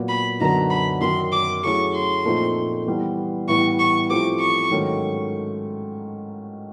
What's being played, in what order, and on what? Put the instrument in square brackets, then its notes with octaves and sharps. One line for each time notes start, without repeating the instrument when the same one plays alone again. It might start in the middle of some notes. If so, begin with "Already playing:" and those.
Already playing: [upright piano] A#2 F#3 B3
[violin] B5
[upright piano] F#2 D3 F#3 B3 D#4 [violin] A#5
[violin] B5
[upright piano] F#2 D#3 F#3 [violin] C6
[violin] D6
[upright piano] F#3 A3 C#4 E4 G#4 [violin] C#6
[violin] C6
[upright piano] A#2 F3 A3 C4 D#4
E3 G3 B3
[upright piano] A2 E3 G3 B3 E4 [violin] C#6
[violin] C#6
[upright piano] F3 A3 C4 E4 G4 [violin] D6
[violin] C#6
[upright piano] G#2 D#3 F#3 A3 C#4